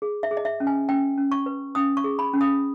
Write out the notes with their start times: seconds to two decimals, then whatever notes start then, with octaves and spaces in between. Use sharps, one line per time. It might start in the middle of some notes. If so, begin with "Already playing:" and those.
0.02 G#4
0.23 E5
0.31 G#4
0.37 D#5
0.45 E5
0.60 C#4
0.67 G#5
0.88 C#4 G5
1.18 C#4
1.32 C#6
1.46 B4
1.75 C#4 D#6
1.97 C#6
2.04 G#4
2.19 B5
2.34 C#4
2.41 D#6